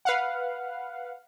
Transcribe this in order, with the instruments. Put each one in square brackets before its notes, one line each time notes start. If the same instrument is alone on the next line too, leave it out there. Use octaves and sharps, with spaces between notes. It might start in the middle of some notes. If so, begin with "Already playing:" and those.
[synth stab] B4 F5 F#5